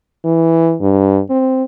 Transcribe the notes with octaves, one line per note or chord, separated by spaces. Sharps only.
E3
G2
C4